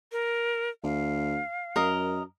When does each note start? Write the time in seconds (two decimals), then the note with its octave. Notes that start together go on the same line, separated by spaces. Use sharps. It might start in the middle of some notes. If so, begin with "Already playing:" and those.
0.12 A#4
0.84 D2 F5
1.76 F#2 A#4 D#5